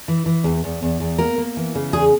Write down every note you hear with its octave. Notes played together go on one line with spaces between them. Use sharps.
E3
E3
E2
E2
E2
E2
A#3 A#4
A#3
E3
C#3
E2 G#4